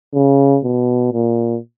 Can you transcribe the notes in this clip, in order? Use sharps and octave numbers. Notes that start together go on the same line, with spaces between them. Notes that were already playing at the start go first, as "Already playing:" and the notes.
C#3
B2
A#2